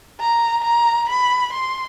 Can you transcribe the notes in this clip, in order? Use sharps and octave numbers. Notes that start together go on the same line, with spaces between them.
A#5
A#5
B5
C6